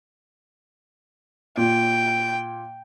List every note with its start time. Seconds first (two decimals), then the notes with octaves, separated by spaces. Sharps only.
1.57 A#2 G5